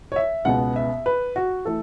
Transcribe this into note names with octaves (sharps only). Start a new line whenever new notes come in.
C#5
E5
C#2 B2 B3 F#5
E5
B4
F#4
E3 A3 A4